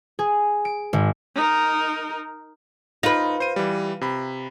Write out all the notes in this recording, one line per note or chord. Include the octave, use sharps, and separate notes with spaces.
G#4
D7
G#1
D#4 A#4
D#4 F4 B4 A#6
C5 D#7
E3 G3
C3 B5